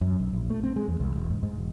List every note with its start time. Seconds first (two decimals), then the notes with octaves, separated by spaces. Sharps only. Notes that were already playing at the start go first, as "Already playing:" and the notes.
0.01 F#2
0.20 B1
0.33 A#1
0.50 A3
0.63 C4
0.76 G#3
0.88 E2
1.00 C2
1.16 E1
1.30 G#2
1.43 G#2
1.58 E1